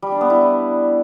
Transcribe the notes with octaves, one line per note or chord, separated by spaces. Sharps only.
G3
D4
B3
E4